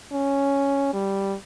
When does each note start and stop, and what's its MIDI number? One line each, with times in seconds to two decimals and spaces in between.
0.12 0.92 61
0.93 1.35 55